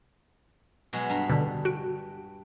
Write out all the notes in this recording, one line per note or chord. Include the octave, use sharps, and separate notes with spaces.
B2 F#3 G#3
G2 A#5 B5
B2 D3
F#4 D7